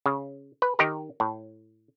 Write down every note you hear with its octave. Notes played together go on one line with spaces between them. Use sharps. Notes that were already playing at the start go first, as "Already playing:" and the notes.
C#3
B4
D#3 D#4 G4 A#4
A2